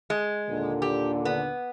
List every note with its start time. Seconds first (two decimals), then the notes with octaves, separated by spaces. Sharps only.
0.10 G#3
0.49 D#2 A#2 D3
0.82 G4
1.25 B3